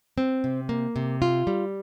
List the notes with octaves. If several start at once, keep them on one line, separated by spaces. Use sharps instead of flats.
C4
C3
A#3
C3
F4
G3